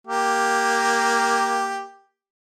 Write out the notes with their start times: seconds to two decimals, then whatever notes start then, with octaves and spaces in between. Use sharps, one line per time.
0.07 A#3 G4